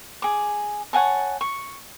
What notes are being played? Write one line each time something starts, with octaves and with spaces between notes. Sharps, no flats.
G#4 D6
C#5 F#5 G#5 A5
C#6